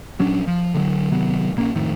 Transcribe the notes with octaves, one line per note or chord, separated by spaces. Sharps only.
A#1 F#3 C#4 D4
F3
D3 F3 F#3
C3 D#3 F#3 B3
A#1 A#3 C#4
G#1 F2 A2 D#3